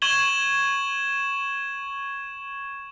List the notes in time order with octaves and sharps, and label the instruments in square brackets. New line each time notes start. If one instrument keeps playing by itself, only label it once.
[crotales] C#6 G#6 E7 F#7 G7